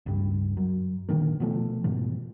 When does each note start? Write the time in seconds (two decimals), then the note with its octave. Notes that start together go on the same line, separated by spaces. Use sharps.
0.06 C#2 G2
0.57 F#2
1.09 A#2 D3 D#3 A#3
1.40 B2 F3 A3
1.84 G#2 B2 E3